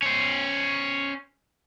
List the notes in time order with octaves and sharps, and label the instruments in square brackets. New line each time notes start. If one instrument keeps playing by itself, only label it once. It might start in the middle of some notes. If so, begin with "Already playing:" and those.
[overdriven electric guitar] C#4 C5